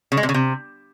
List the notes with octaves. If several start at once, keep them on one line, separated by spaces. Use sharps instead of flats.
C#3
G#3
C3
C#3
C3